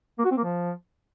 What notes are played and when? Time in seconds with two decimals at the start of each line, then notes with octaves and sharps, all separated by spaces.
0.19 A#3
0.25 F#4
0.31 C4
0.38 A#3
0.44 F3